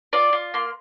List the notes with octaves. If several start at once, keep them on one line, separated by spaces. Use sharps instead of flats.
F4 D5
F4
A#3 C6